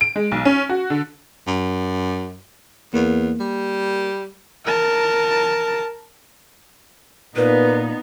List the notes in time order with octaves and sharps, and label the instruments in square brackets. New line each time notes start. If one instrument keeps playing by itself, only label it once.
[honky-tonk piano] D7
G#3
B1
C#4
F#4
D3
[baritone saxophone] F#2
[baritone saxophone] E2 [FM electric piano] A#3
[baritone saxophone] G3
[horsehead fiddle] A#4 A5
[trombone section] A#2 [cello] B3 D#4 [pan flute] B4